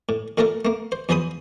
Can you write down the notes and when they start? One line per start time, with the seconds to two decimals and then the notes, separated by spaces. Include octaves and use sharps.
0.09 A2
0.38 A#2 A3 A#3 A4 A#4
0.65 A3 A#3
0.92 C5
1.09 E2 F3 G#4 C5 B5 D#6